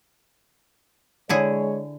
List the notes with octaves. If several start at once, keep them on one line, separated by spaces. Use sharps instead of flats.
D3 G#3 E4 G#4 C#5